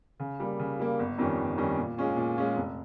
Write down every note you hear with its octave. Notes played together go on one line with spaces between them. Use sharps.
C#3
G3 A#3
C#3
G3 A#3
G1
F2 D#3 G3 C#4
G1
F2 D#3 G3 C#4
A#2
G#3 C#4 F4
A#2
G#3 C#4 F4
F1